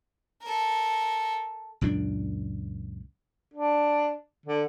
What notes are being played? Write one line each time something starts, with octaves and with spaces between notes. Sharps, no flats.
A4 A#4
C#2 F#2 A#2 D4
D4
D3